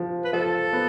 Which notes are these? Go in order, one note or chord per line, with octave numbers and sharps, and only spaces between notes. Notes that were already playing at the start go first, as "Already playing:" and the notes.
Already playing: F3
B4
F3 A4
B3